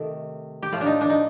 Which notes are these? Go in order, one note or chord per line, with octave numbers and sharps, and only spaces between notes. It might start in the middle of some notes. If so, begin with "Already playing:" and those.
Already playing: C3 D#3 A3
G4
A2 F3 A3 F4
D4
D#4
D4
D#4